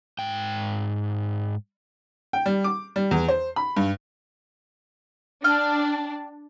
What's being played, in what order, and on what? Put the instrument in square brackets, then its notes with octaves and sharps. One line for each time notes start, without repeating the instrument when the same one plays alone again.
[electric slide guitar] G#2 G5
[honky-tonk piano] G5
G3
D6
G3
E2
C5
B5
G2
[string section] D4 [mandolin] G5 F6